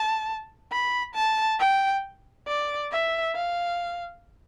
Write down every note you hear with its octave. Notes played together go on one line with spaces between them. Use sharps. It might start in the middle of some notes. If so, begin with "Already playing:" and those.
Already playing: A5
B5
A5
G5
D5
E5
F5